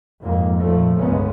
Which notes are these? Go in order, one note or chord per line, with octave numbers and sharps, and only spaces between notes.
F2 G#2 A#3
F2 A#2 F3 A3
G1 C#2 G#3 A3 B3 C#4